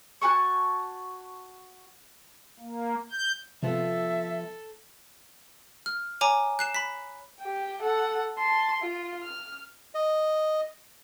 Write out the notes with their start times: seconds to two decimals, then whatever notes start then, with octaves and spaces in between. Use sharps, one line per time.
0.22 F#4 G#5 A5 C#6
2.59 A#3
3.11 G6
3.63 C3 F3 B3 F4 A4 E5
5.86 F6
6.21 C#5 G#5 A#5 D6
6.59 F#6 C7 E7
6.75 B5 B6
7.40 G4 G5
7.82 A4 F#5
8.38 A5 C6
8.82 F4
9.23 F6
9.95 D#5